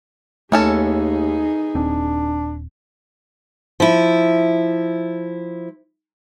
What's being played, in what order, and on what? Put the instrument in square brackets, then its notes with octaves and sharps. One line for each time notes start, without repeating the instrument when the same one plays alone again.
[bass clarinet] D#2 [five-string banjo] E3 C#4 A4 [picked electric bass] A3 [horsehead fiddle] D#4 G#4
[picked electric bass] D#1 C4 [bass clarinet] D4
[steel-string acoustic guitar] F3 E4